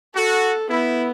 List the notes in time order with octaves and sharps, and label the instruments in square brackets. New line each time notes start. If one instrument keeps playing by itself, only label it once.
[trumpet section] F#4 [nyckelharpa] A4
[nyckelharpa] B3 [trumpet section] E4